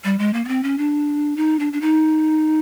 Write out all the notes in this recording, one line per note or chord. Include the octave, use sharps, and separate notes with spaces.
G3
G#3
A#3
B3
C4
C#4
D4
D#4
D4
D4
D#4